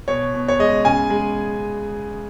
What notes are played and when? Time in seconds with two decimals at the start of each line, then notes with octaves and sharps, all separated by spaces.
0.08 B2 C#5
0.34 B2
0.48 C#5
0.59 G#3 D#5
0.85 C#3 G#5
1.10 G#3